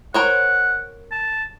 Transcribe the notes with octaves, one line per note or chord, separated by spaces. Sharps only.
A#4 C5 C#5 F#5
A5